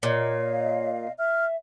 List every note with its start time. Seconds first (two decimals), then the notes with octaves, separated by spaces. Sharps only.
0.03 A#2 C#5 D#5 F5
1.18 E5 F6